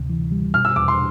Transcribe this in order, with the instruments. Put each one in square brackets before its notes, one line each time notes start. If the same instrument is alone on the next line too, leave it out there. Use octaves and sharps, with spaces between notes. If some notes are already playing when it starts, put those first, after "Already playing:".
Already playing: [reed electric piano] D2 C3
E3
G3
[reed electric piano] B2 [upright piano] F6
[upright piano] E6
[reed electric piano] E2 [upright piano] D6
[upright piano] C6